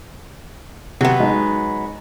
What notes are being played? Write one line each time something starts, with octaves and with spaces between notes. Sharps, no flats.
C3 F#3 B3
G#3 D#4